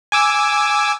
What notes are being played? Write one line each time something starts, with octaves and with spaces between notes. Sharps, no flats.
G#5 D6 E6